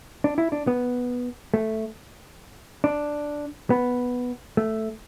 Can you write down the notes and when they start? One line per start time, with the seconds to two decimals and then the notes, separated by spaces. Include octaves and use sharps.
0.24 D4
0.38 E4
0.52 D4
0.67 B3
1.54 A3
2.84 D4
3.70 B3
4.57 A3